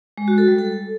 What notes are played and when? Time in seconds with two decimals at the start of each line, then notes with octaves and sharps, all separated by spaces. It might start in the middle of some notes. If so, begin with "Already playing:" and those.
0.18 G#3
0.28 F#4
0.38 A4
0.48 G3
0.58 A4